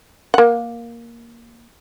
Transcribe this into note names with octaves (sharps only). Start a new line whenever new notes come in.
A#3 F#5